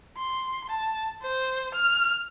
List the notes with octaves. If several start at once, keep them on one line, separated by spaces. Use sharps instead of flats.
C6
A5
C5
F6